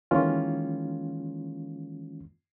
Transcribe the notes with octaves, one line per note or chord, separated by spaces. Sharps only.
D#3 E3 G#3 A#3 C#4 F4